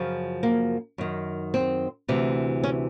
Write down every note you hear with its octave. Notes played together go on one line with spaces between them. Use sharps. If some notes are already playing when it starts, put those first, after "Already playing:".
Already playing: F#2 C#3 F3
A#3
F#2 D#3
C4
D2 C3 E3
C#4